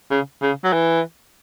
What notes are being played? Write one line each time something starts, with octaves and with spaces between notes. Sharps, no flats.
C#3
C#3
F#3
E3